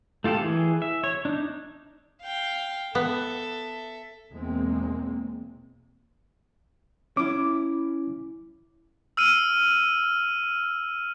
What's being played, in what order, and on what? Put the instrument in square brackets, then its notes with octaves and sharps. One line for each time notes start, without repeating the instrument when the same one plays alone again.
[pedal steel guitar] A3 F4 G4 A4
E3 G#4
E5
C#5
D4 D#4
[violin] F5 G5
[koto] B3 [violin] A4 E5
[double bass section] E2 B2 G#3 A#3 C4
[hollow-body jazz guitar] C#4 E4 [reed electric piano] D6
[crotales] E6 F6 D#7